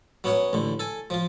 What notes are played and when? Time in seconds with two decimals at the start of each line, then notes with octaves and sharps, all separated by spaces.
0.24 F#3 B3 C#4 C#5 F#5
0.53 A1 D3
0.79 A4 G#5
1.10 F3 F4